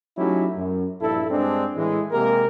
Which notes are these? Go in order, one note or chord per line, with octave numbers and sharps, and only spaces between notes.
F#3 A3 C#4 D#4 E4 G4
F#2
A#1 G2 E4 A4
G2 G#3 C4 D4
A2 E3 G#3
C3 G#3 A#3 G4 A#4